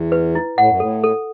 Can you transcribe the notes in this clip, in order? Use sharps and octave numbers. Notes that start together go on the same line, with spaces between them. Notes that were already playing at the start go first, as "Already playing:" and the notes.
Already playing: E2
B4
E4
A2 F#5
F#2
A2 A4
A4